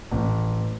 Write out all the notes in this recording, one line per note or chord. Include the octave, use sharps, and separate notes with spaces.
A1